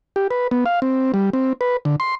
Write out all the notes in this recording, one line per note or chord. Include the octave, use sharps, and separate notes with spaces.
G4
B4
B3
F5
C4
G3
C4
B4
D3
C6